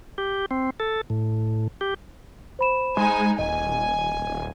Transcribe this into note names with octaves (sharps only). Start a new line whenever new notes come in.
G4
C4
A4
A2
G4
C5 B5 E7
G#3 D#4 G#5
D#1 D#5 G#5